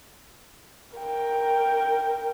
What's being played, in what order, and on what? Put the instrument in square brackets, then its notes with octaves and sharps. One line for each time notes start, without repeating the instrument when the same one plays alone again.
[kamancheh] A#4 G5